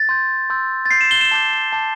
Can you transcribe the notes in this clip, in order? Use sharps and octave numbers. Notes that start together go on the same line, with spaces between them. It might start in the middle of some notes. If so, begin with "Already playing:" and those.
Already playing: A6
C6 G6
C6 E6 G6
A6
C6 G6 C7
E7
G7
E7
A5 D6 G6
A5 D6 G6